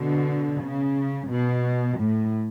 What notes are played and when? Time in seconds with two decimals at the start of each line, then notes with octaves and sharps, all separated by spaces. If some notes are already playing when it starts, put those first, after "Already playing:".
Already playing: B2 D3
0.61 C#3
1.30 B2
1.99 A2